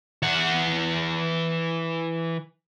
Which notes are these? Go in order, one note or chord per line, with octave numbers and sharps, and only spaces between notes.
E3 F#5